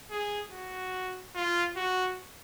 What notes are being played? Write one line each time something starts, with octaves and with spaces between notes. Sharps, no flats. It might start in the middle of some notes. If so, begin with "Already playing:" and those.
G#4
F#4
F4
F#4